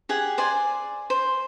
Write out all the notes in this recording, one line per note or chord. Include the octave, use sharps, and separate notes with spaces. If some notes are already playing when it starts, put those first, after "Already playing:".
G4 G#4 F#5
C5 D5 G#5
C5